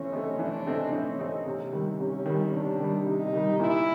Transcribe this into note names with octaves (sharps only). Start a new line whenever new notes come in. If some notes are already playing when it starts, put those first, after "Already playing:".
Already playing: E3 A3 C4 C#4
A3 C4 D#4
E3 D4
A3 C4 D#4
E3 C#4
A3 C4 D#4
C3
D#3 G3
C3 C#4
D#3 G3
C3 D4
D#3 G3
C3 D#4
D#3 G3
A#2 E4